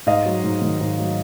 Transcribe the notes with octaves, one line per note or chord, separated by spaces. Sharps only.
G#2 D#5 F5
F#3
G#2
D#3
G#2
F#3